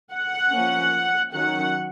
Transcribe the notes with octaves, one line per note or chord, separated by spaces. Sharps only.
F#5
F3 A#3 C#4
D#3 F#3 C#4 F#5